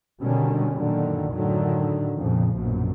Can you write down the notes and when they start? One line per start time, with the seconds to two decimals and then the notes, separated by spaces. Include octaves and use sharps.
0.22 B2 D3 D#3 G3 C#4
0.75 F#2 A#2 D3 D#3
1.33 A2 D3 D#3 F#3
2.17 F2 A#2 C#3 F3
2.57 A#1 F#2 B2